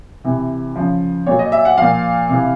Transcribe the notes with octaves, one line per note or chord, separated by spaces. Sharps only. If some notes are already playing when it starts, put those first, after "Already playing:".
C3 E3
C#3 F3
A#2 F#3 C#5
D#5
E5
F#5
A#2 F3 F5
C3 E3